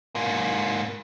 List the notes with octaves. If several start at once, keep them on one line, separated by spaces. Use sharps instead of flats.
G#2 A#3